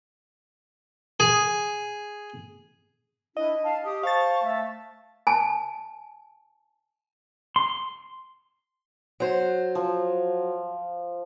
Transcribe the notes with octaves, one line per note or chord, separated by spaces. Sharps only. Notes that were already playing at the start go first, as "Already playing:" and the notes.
G#4
D4 E4 D#5
F5 A5
G4 D#6
C5 F5 A5 C#6 A6
A3 E5 A5
G#5 A5
C6
F#3 C5
F3